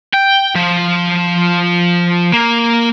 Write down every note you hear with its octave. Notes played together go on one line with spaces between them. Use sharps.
G5
F3
A#3